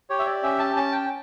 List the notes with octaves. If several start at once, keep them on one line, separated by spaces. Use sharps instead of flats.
G4 C#5
E5
D5
C#4 E5
A5
C#4 A5
G5